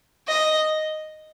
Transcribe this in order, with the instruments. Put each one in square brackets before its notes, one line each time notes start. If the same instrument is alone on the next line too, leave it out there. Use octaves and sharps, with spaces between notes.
[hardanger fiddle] D#5